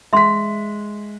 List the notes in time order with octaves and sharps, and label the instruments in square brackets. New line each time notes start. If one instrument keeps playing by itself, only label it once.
[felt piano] G#3 B6 [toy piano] E5 C6